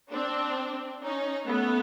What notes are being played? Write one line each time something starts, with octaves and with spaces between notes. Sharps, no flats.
C4 D4
C#4 D#4
A3 B3